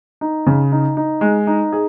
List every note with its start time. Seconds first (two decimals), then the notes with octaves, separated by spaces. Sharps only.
0.21 D#4
0.47 C#3
0.72 D#4
0.97 D#4
1.21 G#3
1.47 D#4
1.73 G#4